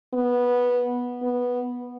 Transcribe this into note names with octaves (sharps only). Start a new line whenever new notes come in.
B3
B3